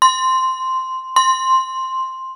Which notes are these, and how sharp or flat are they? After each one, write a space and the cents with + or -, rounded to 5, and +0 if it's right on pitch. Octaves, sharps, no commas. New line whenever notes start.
C6 -5
C6 +5